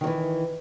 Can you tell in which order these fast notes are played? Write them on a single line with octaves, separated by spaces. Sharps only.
D#3 F#3 E3